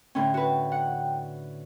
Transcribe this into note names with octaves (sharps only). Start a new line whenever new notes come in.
A2 D3 C#4 G5
F#4 B4
F#5